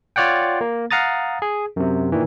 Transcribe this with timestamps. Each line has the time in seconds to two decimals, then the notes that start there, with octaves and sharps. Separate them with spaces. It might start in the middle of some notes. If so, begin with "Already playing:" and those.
0.16 F4 C#5 D5 F#5 G5
0.61 A#3
0.91 F5 F#5 A#5 D#6 A6
1.42 G#4
1.76 F#2 C3
2.12 A#2 D#3 E3